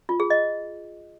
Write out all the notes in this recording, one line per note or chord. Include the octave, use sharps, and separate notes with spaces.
F4
G#4
D#5